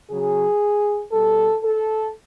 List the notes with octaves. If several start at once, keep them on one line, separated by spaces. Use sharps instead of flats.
C#3 F#3 G#4
B2 G3 A4
A4